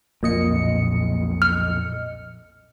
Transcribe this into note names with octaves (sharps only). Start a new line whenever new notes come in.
B1 F2 A#2 D#5 C#7
F6